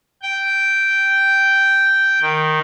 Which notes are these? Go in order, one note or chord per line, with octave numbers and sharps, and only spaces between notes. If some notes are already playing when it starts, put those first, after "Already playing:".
G5
D#3